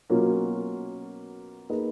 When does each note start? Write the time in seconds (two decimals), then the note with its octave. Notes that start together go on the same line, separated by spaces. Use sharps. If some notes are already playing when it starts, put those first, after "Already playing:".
0.10 B2 F#3 A#3 C#4 F4
1.69 A#3 D#4 G#4 B4 D#5